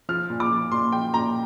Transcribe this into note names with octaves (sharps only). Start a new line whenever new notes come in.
F3 F6
A#2
D6
F3
A#2 C6
F3 G5
A#2 A#5